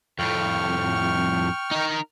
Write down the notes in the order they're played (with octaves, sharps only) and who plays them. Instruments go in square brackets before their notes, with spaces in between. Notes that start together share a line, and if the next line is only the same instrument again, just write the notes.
[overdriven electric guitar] F2 A2 [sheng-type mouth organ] G5 C#6 F6
[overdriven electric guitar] D#4 A#4